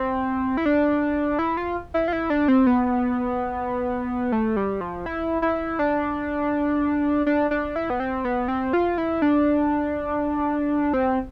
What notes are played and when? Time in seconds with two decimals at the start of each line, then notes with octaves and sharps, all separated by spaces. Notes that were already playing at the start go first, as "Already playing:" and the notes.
Already playing: C4
0.57 E4
0.66 D4
1.39 E4
1.57 F4
1.94 E4
2.08 F4
2.13 E4
2.30 D4
2.48 C4
2.67 B3
4.32 A3
4.56 G3
4.81 F3
5.06 E4
5.42 E4
5.79 D4
7.26 D4
7.51 D4
7.76 E4
7.90 B3
8.00 C4
8.25 B3
8.48 C4
8.73 F4
8.98 E4
9.22 D4
10.93 C4